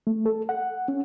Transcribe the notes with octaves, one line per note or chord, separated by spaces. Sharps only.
A3
A4
F#5
C#4